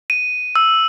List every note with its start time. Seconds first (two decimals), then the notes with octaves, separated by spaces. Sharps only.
0.10 D#7
0.56 E6